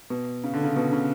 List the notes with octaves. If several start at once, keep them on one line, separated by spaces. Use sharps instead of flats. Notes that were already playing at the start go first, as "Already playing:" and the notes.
B2
C#3
D3
C#3
B2
C#3